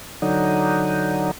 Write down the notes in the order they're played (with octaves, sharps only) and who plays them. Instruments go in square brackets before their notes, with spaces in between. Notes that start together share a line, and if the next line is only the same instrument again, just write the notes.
[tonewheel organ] D3 F#3 D#4